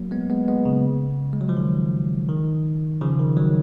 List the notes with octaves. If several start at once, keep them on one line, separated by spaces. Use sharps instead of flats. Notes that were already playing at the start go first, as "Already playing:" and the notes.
Already playing: F#3 A#3
G#3 B3
G#3 B3
G#3 B3
C#3
G#3
F#3
F3
D#3
D#3
C#3 F3
D#3
D#3 F#3